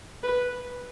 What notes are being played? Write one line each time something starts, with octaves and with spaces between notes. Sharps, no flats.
B4